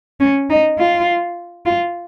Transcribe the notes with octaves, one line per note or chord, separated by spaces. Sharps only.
C#4
D#4
F4
F4